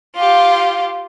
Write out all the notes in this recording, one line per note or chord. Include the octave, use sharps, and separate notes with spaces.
F4 G4